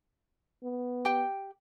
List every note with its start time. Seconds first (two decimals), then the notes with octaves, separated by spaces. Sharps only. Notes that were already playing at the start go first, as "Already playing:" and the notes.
0.63 B3
1.05 G4 G5